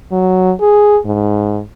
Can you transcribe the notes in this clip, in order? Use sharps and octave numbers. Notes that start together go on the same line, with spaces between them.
F#3
G#4
G#2